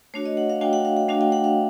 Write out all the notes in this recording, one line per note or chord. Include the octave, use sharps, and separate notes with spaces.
A3 D4 F#4 C#5
D#5
F#5
F5
A3 D4 F#4 G5
F#5
F5
F#5
A3 D4 F#4 F5
G5
F#5
F5